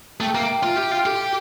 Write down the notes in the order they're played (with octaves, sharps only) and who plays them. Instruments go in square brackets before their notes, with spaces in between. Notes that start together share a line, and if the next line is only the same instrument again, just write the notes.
[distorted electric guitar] A3 [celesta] G5
[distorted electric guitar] A#3 [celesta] E5
[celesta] G5
[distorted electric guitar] F4 [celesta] E5
[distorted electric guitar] G4 [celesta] E5
[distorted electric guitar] F4 [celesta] G5
[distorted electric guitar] G4 [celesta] A4
[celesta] G5